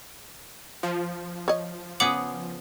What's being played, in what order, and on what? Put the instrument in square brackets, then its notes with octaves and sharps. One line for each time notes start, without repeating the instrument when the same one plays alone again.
[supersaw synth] F3
[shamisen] C#5 D#5
[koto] C#3 B3 G#4 [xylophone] F#5 D6 F#7